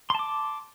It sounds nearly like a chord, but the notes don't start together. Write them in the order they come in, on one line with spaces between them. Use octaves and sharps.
C6 A5 D6